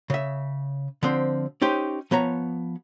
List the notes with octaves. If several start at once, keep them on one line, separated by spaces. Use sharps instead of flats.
C#3 E5
D3 F3 C4
C#4 D#4 G4 C5
F3 B3 C#5 A#5